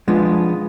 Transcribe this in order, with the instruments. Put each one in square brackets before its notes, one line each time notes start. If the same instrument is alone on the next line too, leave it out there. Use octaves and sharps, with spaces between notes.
[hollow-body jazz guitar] F3 G#3 B3 D4 F4